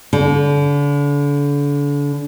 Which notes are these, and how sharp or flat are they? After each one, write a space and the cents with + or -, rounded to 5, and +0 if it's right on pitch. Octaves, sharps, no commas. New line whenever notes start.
D3 -35